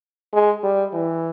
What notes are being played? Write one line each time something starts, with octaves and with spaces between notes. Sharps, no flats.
G#3
G3
E3